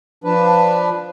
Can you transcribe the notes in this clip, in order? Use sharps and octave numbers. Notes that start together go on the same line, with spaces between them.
F3 D4 B4